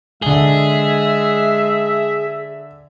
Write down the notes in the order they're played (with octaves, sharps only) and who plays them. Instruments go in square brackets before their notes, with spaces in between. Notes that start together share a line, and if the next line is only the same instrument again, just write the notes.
[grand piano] D3 G7 [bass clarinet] G#3 [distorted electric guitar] G#4 [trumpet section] E5